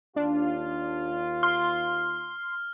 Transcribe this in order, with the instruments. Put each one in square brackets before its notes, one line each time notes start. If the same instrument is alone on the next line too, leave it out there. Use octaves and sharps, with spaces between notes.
[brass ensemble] D#2 F4 [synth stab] D4
[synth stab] C6 [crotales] F6